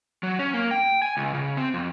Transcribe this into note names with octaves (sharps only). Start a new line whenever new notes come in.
F#3
C#4
A#3
G5
G#5
C#2
C#3
C4
F2